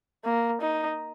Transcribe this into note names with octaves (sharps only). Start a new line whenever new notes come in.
A#3
D#4